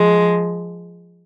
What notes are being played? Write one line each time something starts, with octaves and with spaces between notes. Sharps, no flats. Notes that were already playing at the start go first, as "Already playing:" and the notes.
Already playing: F3 G#3